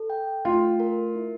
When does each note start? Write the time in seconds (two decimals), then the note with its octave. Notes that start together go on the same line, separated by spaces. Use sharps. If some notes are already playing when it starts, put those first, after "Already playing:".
Already playing: A4
0.10 G5
0.45 A3 F4
0.80 A#4
1.15 E4